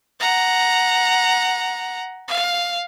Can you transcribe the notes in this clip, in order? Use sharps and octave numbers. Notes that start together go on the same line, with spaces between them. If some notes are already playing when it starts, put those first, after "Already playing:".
F#5 A#5
F5